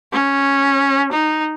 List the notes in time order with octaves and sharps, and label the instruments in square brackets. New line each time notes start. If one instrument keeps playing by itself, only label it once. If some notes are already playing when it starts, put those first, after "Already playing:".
[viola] C#4
D#4